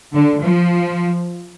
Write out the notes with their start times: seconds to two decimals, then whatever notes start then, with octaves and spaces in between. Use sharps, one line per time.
0.14 D3
0.43 F3